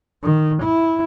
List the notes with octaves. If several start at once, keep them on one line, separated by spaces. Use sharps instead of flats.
D#3
E4